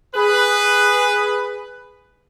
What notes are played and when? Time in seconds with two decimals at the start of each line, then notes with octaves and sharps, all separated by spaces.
0.15 G#4 B4